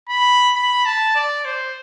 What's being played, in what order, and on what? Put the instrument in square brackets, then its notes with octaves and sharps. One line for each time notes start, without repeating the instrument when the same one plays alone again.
[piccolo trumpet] B5
B5
A5
D5
C5